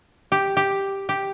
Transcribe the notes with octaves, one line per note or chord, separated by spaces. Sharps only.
G4
G4
G4